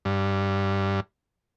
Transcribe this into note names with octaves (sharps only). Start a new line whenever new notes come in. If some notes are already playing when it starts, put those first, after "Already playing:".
G2